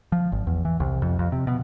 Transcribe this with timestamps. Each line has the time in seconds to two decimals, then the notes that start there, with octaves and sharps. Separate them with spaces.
0.12 F3
0.32 G#1
0.47 E2
0.65 E3
0.80 C2
1.02 F2
1.19 F2
1.32 C3
1.47 B2